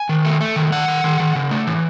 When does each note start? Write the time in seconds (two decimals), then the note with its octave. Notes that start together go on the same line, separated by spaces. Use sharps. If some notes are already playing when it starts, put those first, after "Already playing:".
Already playing: G#5
0.09 D#3
0.25 A3
0.41 A3
0.56 D#3
0.72 D#3 F#5
0.88 D#3
1.04 D#3
1.20 D#3
1.35 C#3
1.51 A3
1.67 E3